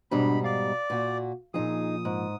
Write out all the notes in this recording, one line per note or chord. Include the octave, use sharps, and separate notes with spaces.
G#2 B2 G3 D4 C5 B5
D5 F5
A#2 F#4
A#2 F3 D#4 G#4 D#6
G#2